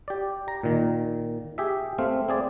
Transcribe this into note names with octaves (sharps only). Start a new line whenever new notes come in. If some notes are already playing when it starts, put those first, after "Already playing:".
G4 D5
A#5
A#2 D#3
G4 G#4 E5
A3 C4 F5
C4 G#4 D5